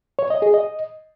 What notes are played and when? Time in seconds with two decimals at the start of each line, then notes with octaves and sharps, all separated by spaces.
0.19 C#5
0.30 D#5
0.42 G#4
0.54 D#5